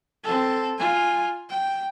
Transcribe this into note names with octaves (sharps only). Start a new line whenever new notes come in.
C4 A4
F4 G#5
G5